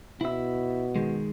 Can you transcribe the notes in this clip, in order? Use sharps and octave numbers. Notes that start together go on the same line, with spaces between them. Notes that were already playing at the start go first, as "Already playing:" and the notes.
B2 E4 E5
D#3 G#3